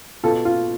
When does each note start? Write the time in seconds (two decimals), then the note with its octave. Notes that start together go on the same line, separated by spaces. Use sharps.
0.24 B2 F4 A4
0.45 F4